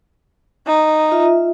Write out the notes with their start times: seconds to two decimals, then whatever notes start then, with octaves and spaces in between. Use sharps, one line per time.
0.67 D#4
1.12 F4 E5